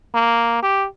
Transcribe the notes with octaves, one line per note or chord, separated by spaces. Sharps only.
A#3
G4